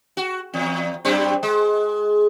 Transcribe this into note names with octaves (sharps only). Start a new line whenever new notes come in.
F#4
E2
F#2 G3 C4
G#3